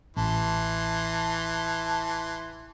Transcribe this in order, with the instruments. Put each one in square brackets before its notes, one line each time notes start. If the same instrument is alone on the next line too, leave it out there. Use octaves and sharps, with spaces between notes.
[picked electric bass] A1 [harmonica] E3 C6 [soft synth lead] A5